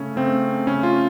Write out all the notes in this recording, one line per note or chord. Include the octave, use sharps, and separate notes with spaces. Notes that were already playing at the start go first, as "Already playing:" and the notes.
Already playing: C#3 A3 C#4
C#3 A3 C4
C#3 A3 C#4
F4